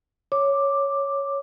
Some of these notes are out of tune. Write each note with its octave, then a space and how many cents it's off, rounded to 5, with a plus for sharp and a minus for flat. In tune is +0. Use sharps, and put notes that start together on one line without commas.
C#5 +0 D6 +0